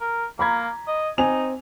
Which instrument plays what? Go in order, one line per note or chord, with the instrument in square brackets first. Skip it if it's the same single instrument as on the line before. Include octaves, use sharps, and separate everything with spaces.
[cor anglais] A#4
[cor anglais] A#3 [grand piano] A#5 B5 G#6
[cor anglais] D#5
[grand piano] C4 G#5 F7 [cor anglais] D#4